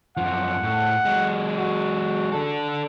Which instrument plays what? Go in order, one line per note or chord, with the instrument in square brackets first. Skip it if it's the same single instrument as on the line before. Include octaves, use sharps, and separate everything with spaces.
[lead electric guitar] F#2 F3 [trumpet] F#5
[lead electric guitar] A2
F#3 G#3
[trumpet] F#4
[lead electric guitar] D4 A4